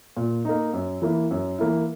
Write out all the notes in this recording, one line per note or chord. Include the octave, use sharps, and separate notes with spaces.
A#2
A#3 D#4
F#2
E3 A#3 E4
F#2
E3 A#3 E4